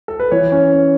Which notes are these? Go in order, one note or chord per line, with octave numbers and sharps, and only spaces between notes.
A4
B4
E3 C#5
C#4
C#4